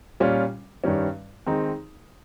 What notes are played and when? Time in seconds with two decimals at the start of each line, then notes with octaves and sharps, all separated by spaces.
0.20 A#2 G3 C#4 F4
0.84 G2 D#3 G3 C#4
1.46 D#3 G#3 C4 D#4